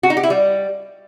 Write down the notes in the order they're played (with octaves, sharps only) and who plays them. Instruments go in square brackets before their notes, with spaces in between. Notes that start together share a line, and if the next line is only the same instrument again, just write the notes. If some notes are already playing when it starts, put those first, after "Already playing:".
[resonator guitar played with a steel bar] F#4
D#4
G4
E4
G3